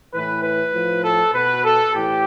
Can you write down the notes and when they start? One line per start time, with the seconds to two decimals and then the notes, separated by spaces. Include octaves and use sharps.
0.14 A2 E3 B4
0.43 B4
0.73 A2 F3
1.04 A4
1.34 B2 B4
1.64 A4
1.94 A2 E3 G4